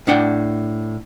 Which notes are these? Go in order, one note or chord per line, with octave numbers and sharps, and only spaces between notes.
A2 D4 F#5 G5